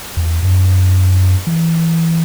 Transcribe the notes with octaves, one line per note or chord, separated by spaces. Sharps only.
E2
F#2
E3